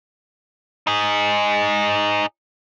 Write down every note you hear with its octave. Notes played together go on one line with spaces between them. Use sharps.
D#4 G#4